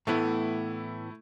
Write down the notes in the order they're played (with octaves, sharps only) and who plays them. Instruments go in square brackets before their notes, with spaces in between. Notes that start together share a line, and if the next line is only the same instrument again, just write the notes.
[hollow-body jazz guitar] A2 E3 B3 [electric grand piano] A3 E4